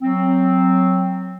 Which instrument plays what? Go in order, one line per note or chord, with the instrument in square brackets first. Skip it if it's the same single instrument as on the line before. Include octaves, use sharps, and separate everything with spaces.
[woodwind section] F#3 C4